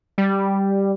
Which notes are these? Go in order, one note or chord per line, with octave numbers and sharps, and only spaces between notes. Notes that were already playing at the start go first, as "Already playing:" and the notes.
G3